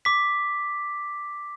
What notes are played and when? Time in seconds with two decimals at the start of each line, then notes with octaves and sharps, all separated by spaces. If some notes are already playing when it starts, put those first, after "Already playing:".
0.05 D6 B6